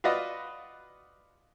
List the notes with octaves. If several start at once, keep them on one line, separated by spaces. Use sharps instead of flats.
F4 F#4 B4 D5 D#5